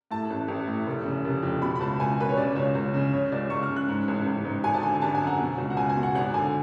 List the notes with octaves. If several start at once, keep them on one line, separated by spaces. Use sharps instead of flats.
A2 A5
A1
A1
A2
F1
C#3
F1
F2
B2 B5
B5
C#2 A5
C#2 G#5
B2 B4
C#5
C#3 D5
C#2 C#5
C#2
C#3
C#3 C#5
C#2 D5
C#2 C#6
F6
C#3
F#6
G#2
A1
A1
G#2
G#1 G#5
A5
D3 G#5
G#1 A5
G#5
F#2
F#5
B2
C#2
F#5
C#2 G#5
G#5
B2
F#5
G#1 F#5
D3 G#5